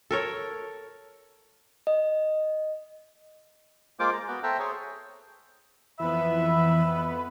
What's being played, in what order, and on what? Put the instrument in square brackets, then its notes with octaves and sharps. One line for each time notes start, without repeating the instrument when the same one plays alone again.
[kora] A4 A#4 C#5
[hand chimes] D#5
[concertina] G#3 A#3 F4 C5 D6
A#5
B3 F#4
A4 C5 E5 G5 A#5
G#4 C5 C#5
[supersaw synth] F2 B3 B4 [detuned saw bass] E3 [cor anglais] E5 [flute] B5